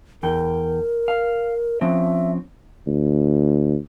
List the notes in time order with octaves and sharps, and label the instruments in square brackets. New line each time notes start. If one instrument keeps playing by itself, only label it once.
[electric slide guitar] E2 G5 [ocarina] A#4
[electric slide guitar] F5
[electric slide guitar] F3 C4 C#4 [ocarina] E5
[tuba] D2